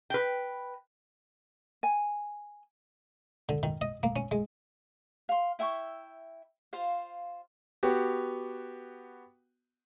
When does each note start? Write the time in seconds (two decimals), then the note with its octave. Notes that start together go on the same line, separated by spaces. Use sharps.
0.10 B4 G5
1.83 G#5
3.49 D3
3.63 D#3
3.81 D#5
4.03 A#3
4.16 C#4
4.31 G#3
5.29 F5 C6
5.59 E4 E5 G5 C#6
6.73 F4 C5 F5
7.83 B3 F#4 G4